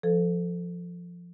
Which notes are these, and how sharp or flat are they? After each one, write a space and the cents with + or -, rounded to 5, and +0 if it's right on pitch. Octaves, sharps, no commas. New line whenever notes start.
F3 +0 A4 +0 C5 -35